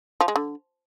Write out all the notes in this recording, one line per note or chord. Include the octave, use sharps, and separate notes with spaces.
F3
G#3
D3